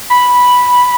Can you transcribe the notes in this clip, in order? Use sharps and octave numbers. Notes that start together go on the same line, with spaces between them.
B5